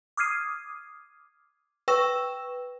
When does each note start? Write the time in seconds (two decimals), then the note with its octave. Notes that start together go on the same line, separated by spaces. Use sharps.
0.17 D6 D#6 F6 G#6 C7 D#7
1.88 B4 G5 C#6 E6 A#6 E7